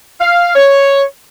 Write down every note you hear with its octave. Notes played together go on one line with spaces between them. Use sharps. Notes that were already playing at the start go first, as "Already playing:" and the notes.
F5
C#5